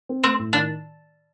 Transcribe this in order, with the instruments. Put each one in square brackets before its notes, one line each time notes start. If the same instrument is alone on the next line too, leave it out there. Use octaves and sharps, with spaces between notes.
[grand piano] C4
[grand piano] A3 [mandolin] C4
[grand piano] A2
[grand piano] D#3 [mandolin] D4